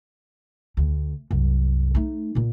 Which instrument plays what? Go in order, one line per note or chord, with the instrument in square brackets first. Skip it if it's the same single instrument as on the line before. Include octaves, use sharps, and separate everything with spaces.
[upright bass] D2
C2 F#2
A3 D#4
A#2 A#3